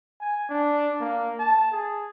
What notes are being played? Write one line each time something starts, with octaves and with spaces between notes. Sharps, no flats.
G#5
D4
A#3
A5
G#4